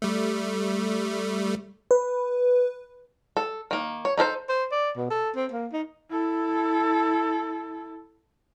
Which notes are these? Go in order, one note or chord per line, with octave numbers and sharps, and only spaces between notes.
G3 A3
B4
A4
D#3 A#3
C#5
D#4 A4 A#4 C5
C5
D5
B2
A4
C4
A#3
D#4
E4 A4